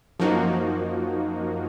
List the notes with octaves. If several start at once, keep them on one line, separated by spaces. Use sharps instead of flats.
F#2 F3 A#3 D#4 F#4